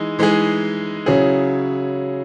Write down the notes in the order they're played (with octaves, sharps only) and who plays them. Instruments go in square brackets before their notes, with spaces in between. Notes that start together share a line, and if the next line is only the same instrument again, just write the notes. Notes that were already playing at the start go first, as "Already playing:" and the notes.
Already playing: [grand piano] E3 G#3 D#4 G#4
E3 G#3 D#4 G#4
C#3 F#3 C#4 E4 G#4